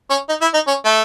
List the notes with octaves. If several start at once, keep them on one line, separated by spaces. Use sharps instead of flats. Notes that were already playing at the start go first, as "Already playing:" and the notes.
C#4
D#4
E4
D#4
C#4
A3